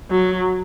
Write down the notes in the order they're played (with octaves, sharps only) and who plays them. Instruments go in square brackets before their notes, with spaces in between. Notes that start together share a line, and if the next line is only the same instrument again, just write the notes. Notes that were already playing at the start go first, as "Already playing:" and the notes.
[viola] F#3